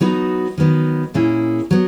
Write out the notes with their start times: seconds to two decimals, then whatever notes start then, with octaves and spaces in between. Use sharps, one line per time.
0.01 F#3 B3 D#4 F#4 B4
0.58 D#3 F#3 B3 D#4
1.14 A#2 A#3 C#4 E4 G#4
1.71 F#3 B3